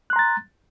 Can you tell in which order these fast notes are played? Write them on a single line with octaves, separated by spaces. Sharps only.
F#6 C6 A#5 A6